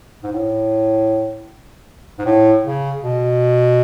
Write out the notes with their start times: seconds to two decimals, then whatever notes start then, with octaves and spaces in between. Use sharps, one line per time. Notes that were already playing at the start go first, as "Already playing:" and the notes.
0.23 G#2
0.33 A2
2.19 G#2
2.26 A2
2.64 C#3
3.03 B2